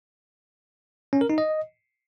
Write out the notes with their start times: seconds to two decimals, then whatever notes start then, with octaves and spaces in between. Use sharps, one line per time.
1.13 C#4
1.21 A#4
1.30 D#4
1.38 D#5